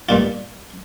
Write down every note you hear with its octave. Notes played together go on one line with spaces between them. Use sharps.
G2 A#2 F4